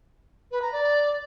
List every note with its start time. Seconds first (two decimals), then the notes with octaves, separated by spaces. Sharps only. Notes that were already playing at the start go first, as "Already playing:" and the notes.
0.51 B4
0.62 A#5
0.72 D5